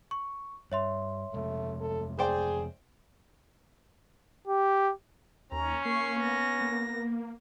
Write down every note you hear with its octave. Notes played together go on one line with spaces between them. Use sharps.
C#6
G2 C#5 E5 C6
F2 C3 G#3 A3
A4
G#4 C5 D5 G5
G4
D#2 C#4 A#5
A#3 C#6 C7
B3 A#6
A#3